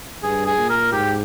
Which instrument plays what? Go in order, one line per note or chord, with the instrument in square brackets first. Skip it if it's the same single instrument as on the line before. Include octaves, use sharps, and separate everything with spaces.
[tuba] G2 [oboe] G#4
[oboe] G#4
[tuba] A#2
[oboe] A#4
[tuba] G#2 [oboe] G4